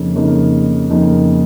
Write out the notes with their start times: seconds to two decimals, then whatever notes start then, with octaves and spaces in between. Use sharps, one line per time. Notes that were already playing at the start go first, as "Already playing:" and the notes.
Already playing: F2 C#3 A#3 D#4
0.16 F2 C#3 A#3 D#4
0.90 F2 C#3 A#3 D#4